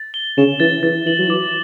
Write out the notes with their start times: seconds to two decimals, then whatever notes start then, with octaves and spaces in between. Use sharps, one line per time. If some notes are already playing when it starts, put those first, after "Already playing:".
Already playing: A6
0.14 G7
0.37 C#3 E7
0.60 E3 A6
0.83 E3 A6
1.06 E3 F#7
1.19 F#3
1.29 E3 D6